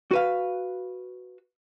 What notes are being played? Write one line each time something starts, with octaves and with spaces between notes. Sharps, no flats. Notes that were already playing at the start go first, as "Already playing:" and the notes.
F#4 B4 F5